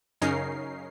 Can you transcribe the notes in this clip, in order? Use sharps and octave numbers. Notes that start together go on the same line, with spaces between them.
F#2 C#3 C#4 D#4 A#4 C7